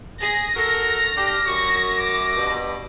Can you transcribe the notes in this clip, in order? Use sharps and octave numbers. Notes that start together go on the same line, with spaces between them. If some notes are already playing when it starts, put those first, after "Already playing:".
G#4 A#6
F#4 A4 A#4 F6
D4 G4
F#2 C#6
D6
G2 B2